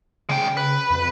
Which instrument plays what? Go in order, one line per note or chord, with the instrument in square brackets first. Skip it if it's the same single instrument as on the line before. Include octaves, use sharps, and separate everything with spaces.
[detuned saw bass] C#3 [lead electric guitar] G#3 G5
[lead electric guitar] B4
[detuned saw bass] F2